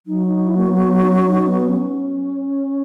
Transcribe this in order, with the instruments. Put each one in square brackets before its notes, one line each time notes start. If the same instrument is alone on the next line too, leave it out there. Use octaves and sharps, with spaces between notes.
[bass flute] F#3 [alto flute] D#4
[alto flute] D#4
E4
A#3
B3
B3
D#4
C#4
D#4
B3
C#4